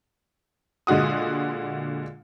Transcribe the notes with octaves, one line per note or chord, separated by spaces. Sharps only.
A#2 D3 G#3 F#4 D#6